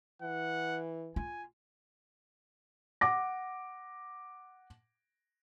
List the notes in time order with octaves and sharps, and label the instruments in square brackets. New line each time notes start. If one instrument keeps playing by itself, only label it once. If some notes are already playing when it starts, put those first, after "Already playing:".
[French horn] E3 [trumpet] F#5
[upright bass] F4 [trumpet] G#5
[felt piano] F#5 D6 A#6